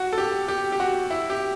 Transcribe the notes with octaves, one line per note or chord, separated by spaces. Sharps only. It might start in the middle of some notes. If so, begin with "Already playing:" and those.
Already playing: F#4
A4
G4
G4
G4
F#4
E4
G4